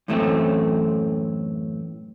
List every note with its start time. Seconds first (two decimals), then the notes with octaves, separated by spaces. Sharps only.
0.08 F#2 A2 E3 A3 C4